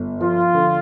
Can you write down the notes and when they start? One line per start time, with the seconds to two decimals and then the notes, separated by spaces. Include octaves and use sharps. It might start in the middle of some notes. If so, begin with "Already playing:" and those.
Already playing: G1
0.21 F3 F4
0.55 D3